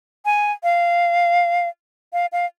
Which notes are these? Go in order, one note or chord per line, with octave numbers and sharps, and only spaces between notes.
G#5
F5
F5
F5